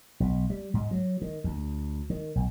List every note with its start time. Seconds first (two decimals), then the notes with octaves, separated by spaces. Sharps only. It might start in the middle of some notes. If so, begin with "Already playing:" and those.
0.20 B1
0.50 G3
0.74 G#2
0.91 F#3
1.22 D#3
1.44 D2
2.10 D#3
2.36 B1